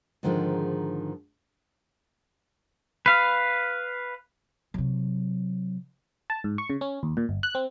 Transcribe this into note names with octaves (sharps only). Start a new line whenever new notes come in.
G#2 D3 D#3 F3 G#3
B4 F5
C3 F#3
A5
G#2
C#6
C#3
C#4
D#2
A#2
G1
F#6
C4